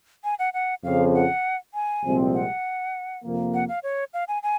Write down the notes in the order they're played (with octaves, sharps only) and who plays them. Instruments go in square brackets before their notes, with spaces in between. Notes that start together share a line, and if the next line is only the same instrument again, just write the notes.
[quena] G#5
F#5
F#5
[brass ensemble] F2 C#3 F3 [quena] F5
[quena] F#5
G#5
[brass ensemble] C2 A#2 F3 G#3 C4
[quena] F#5
[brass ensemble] F2 C3 F3 A#3
[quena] F#5
F5
C#5
F5
G#5
G#5